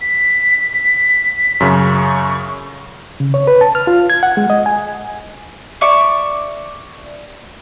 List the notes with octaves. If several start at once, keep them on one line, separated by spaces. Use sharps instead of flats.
B6
F#2 C#3 C#6
C#3
C#5
B4
A5
F6
F4
G#6
F#5
G#3
D#5
G#5
D5 E5 C#6 D6